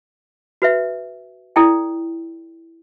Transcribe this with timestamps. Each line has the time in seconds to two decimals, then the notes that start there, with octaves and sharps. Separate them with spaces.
0.62 F#4 B4 E5
1.56 E4 A4 D5 G5